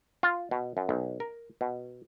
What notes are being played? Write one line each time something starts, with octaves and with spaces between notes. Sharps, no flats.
F4
B2
F#2
B1
A#4
B2